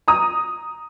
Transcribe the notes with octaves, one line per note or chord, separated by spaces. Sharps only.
A#5 D#6